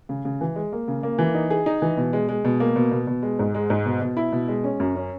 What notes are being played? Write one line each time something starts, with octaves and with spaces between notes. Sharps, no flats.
C#3
C#3
E3
G#3
A#3
C#3
A#3
E3
D#4
G#4
D#4
E3
B2
G#3
G#3
B2
A#3
B2
B2
B2
G#3
G#2
G#3
G#2
B2
B2
E4
B2
G#3
C#4
F#2
C#4